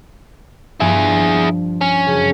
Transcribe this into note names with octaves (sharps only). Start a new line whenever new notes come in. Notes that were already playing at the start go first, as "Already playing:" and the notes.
G2 F3 E4 G#4
C#4
F#1